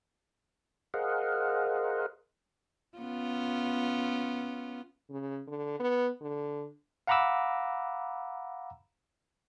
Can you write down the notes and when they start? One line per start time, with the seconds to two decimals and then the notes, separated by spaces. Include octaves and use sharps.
0.94 G#4 A#4 C5 D#5 F5 F#5
2.98 B3 C#4 F4
5.10 C#3
5.47 D3
5.80 B3
6.21 D3
7.07 F5 F#5 A#5 B5 D6 E6